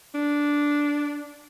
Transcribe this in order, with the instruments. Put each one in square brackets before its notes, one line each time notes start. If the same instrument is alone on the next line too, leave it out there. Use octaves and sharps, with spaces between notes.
[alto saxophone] D4